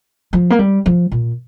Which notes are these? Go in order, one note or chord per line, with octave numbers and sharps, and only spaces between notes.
F3
A#3
G3
F3
A#2